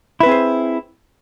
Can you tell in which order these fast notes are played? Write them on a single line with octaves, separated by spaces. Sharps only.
E4 B4 C4 G#4 C5